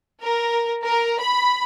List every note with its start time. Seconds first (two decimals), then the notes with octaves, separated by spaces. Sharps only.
0.22 A#4
0.84 A#4
1.21 B5